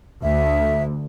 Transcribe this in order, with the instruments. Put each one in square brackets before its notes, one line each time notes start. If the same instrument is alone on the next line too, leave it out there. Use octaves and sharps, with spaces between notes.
[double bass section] D2 [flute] E5